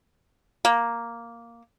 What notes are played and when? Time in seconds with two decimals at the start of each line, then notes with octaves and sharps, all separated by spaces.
0.65 A#3